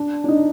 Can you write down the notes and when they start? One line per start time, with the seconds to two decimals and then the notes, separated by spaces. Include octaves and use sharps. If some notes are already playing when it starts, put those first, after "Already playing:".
Already playing: D4
0.24 D4
0.29 D#4